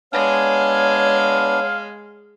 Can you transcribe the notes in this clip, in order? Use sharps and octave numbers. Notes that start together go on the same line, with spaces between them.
G#3 B3 D4 C#5 F5 G#5